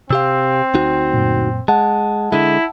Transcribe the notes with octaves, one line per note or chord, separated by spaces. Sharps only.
C3 C4 G4 F5 E6
D2 D#4 F#4
F#2 A#2
G#3 F#5 A5
D3 G#3 E4